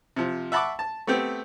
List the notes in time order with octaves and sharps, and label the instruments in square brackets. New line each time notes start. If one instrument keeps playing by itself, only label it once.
[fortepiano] C3 F3
E5 F#5 A5 B5 C#6 D6
A5
A3 B3 C4 G4